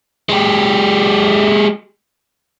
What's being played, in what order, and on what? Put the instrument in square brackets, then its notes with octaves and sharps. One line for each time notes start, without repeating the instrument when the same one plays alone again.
[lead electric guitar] G#3 G4